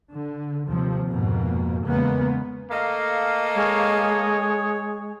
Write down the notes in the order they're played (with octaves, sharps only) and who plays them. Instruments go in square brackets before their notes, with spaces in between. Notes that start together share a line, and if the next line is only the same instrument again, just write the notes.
[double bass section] D3
D#2 C3 F3
F2 G#2 B2 A#3
E2 C#3 G#3 A#3 B3
[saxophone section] A3 A4 D#5 [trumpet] A#3 [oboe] F5
[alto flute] G#3 [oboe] C#5